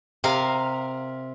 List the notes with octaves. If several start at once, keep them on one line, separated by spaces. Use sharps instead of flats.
C3 A#4 F5